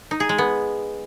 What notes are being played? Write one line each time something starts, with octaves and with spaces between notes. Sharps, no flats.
D#4
G#4
G#3
B3